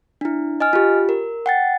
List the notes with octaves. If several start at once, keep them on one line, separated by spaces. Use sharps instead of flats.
D4 E4
D#5 G#5 F6
F4 G4
A#4
F#5 G5 A6